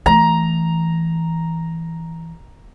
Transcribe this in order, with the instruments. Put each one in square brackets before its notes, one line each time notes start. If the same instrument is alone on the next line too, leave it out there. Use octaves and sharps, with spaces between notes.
[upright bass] E3 A3 [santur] A#5